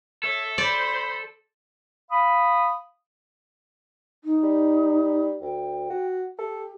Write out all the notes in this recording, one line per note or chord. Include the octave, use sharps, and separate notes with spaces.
A4 C#5 E5
C5 D5 B5
F5 B5 D#6
D#4
G3
D2 G5
F#4
G4 A4